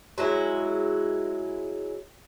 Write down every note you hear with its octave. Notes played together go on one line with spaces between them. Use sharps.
F#3 G#3 E4